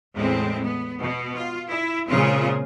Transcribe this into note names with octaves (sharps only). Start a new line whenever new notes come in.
E2 A2 G#3 C4
B3
B2
F4
E4 E5
A#2 C#3 G#3 C4 F4 G#4